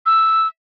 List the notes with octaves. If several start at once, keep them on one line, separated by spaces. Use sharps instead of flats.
E6